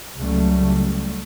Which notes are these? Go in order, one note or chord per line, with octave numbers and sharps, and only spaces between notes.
C#2 C#3 F#3 G3 A3